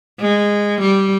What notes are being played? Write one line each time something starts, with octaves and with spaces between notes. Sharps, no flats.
G#3
G3